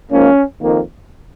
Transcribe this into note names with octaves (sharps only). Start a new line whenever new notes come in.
G#2 F3 A#3 C#4
F2 D#3 A#3